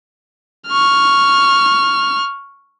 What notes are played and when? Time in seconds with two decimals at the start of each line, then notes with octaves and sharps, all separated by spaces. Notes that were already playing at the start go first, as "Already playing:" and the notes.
0.68 C#6 F6